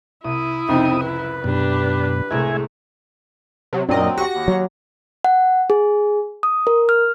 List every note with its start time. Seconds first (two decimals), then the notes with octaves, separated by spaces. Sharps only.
0.24 C2 E4 D#6
0.69 C2 F2 C#3 C4 D#4
1.02 B4
1.44 F#2 B2 D4 G4
2.31 C2 A2 G#3 A3 E5 G#5
3.73 C3 F#3
3.89 F#2 A#2 F#3 C4 D4 A#4 D#5
4.17 F#4 G4 F#5 A#6 C#7
4.34 D#2
4.48 F#3
5.24 F#5
5.70 G#4
6.43 D#6
6.67 A#4
6.89 F6